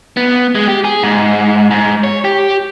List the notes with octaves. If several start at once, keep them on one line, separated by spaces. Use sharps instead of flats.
B3
G#3
G4
G#4
G#2
G#2
C#5
G4